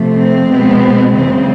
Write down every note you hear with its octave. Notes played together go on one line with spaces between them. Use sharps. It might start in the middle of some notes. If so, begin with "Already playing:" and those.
Already playing: C3 F3 A3
C4
B2 G#3 B3
F#2 C#3 E3 G#3 C4